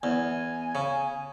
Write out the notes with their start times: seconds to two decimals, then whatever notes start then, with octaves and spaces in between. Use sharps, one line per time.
0.03 E2 G#5
0.75 C#3